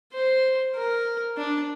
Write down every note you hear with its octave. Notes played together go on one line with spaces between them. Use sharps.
C5
A#4
D4